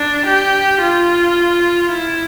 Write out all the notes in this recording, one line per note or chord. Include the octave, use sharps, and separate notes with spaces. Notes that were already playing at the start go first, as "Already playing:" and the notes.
Already playing: D4
G4
F4
E4